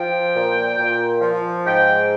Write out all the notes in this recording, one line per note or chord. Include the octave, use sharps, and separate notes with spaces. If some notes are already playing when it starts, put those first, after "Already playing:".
Already playing: F3 G5
A#2
A#2
F3
G#2 G5